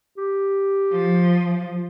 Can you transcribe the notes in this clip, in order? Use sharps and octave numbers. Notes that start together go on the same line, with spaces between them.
G4
F3